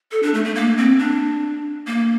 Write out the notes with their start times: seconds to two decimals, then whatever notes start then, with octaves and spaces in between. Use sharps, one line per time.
0.12 A4
0.23 D4
0.34 A3
0.45 A3
0.55 A#3
0.78 C4
0.99 D4
1.87 A#3